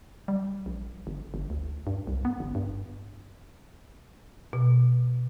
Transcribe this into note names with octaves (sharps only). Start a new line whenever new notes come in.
G3
A#1
G1
G1
D2
G2
C2
B3
G1
G2
B2